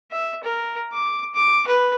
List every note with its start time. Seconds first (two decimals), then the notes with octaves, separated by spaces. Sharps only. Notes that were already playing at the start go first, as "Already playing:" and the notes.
0.12 E5
0.43 A#4
0.92 D6
1.34 D6
1.67 B4